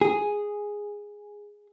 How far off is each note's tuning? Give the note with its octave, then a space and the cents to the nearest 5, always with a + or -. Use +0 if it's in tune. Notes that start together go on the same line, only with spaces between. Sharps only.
G#4 -5